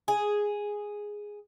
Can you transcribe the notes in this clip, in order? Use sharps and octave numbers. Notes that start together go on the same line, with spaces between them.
G#4